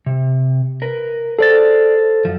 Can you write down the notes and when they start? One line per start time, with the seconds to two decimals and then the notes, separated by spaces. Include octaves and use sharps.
0.06 C3
0.82 A#4 B4
1.39 G#4 A4 C5 D5 A6
2.25 F#2 F3